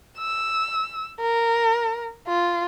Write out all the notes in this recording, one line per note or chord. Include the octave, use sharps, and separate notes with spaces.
E6
A#4
F4